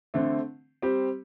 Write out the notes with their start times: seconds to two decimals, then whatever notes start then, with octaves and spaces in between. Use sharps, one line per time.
0.14 D3 A3 C4
0.82 G3 C4 G4